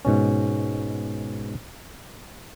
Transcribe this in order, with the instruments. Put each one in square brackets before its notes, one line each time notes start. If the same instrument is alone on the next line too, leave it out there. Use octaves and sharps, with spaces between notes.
[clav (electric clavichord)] G#2 B2 C#4